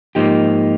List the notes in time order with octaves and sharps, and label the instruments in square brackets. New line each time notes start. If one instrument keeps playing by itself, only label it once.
[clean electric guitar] G#2 F3 A#3 D#4 G4